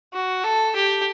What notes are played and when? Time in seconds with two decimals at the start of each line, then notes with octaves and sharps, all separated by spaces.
0.13 F#4
0.44 A4
0.76 G4